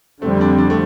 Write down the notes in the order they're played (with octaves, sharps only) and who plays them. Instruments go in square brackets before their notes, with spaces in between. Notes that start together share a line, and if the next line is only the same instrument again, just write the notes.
[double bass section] F2 D3 G3 C4 [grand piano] A3
[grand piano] D4
D4
A3